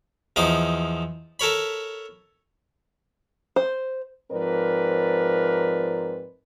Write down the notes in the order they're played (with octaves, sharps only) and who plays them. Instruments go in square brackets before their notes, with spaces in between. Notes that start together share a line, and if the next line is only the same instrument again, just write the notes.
[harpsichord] E2 F3 D#4 D6
A4 A#4 C#5 B5
[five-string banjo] C5
[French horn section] G#2 F3 C4 A#4 B4 D5